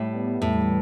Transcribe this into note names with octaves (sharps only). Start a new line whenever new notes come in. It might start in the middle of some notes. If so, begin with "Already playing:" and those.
Already playing: A2 G3
B3
E2 A2